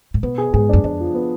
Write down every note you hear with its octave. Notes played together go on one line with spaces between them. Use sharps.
A2
B2 B3
G#4
G#2 G#4
F#2 D4
F2 D4
F3
B3